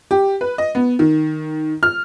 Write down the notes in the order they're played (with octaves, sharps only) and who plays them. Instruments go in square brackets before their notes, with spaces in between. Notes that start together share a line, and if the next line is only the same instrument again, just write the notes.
[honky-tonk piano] G4
B4
D#5
B3
D#3
F6